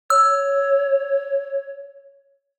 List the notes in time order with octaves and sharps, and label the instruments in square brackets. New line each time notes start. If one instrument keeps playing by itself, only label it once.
[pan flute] C#5 [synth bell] E6